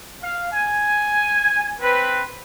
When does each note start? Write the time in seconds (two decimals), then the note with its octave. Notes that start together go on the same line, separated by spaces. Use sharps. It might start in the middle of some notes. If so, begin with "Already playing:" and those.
0.22 F5
0.52 G#5
1.81 C4 B4